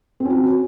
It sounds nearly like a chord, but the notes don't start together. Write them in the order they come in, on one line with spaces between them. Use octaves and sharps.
C4 C#4 F#4